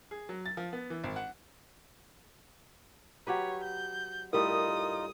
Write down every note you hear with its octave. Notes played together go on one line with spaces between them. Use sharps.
G#4
F#3
A6
F3
B3
E3
G#1
F#5
F#3 G4 B4 C#5
G6
A2 G3 D#4 F4 A#4 D#5 D#6